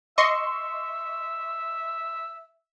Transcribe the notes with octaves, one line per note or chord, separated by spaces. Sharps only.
D#5 E5 C6 C#6